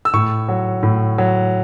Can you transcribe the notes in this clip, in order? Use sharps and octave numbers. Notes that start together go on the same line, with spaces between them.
E6
A2 C#6
F#3
A2
F#3